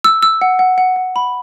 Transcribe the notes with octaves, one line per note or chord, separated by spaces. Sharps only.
E6
E6
F#5
F#5
F#5
F#5
B5